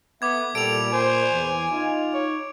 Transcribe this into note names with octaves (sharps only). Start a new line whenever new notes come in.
B3 A4 E5 D6 G#6
A#2 G3 A4 D7 F7
C5 G#5
E2 E3
D#4 F4
C#5